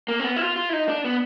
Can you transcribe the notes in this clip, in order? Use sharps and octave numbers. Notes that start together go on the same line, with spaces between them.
A#3
C4
B3
E4
F4
F4
E4
D#4
D4
B3